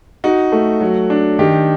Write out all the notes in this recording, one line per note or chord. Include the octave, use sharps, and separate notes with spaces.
D#4 F#4
A3
F#3
D4
D#3 G4